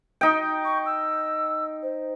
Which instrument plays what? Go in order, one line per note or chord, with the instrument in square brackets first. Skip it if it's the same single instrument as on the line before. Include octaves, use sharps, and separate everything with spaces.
[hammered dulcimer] D#4 G5
[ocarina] C#6
E6
C5